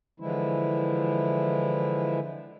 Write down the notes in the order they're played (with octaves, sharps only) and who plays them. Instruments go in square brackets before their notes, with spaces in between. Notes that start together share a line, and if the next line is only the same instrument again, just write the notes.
[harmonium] D3 E3 F3 G#3 E4